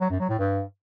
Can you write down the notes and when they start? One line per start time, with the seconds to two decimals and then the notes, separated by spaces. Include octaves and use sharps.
0.01 F#3
0.10 F#2
0.20 F#3
0.29 A2
0.38 G2